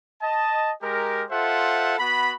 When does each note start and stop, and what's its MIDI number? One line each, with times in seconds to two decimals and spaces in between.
0.22 0.71 75
0.22 0.71 81
0.82 1.23 56
0.82 1.23 67
0.82 1.23 70
1.30 1.95 65
1.30 1.95 69
1.30 1.95 72
1.30 1.95 76
1.30 1.95 78
1.99 2.31 59
1.99 2.31 66
1.99 2.31 83